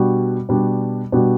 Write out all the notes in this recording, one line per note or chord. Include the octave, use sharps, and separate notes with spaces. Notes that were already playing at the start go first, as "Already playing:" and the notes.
Already playing: B2 G3 D4 F#4
B2 G3 D4 F#4
B2 G3 D4 F#4